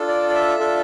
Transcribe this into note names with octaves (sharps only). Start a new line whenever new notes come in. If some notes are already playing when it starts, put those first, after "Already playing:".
Already playing: D4 F4 A4
D5
D5
E5
D4 F4 A4